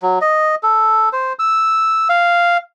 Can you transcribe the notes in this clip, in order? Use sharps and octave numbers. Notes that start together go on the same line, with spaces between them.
F#3
D#5
A4
C5
E6
F5